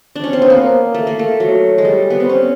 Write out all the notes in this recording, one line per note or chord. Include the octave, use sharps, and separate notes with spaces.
D4
C#4
C4
B3
A#3
A3
A#3
A3
F#3
G#3
G3
B3
C4
C#4